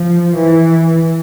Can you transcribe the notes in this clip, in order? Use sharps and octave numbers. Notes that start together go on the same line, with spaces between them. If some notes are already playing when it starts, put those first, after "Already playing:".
Already playing: F3
E3